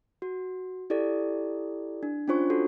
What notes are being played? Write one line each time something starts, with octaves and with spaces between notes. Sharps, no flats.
F#4
E4 G4 A4 D5
D4
C#4 D4 F4 C5 C#6
F#4 A4